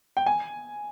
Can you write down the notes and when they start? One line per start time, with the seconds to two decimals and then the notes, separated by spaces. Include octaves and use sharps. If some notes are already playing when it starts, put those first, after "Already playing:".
0.17 G5
0.26 G#5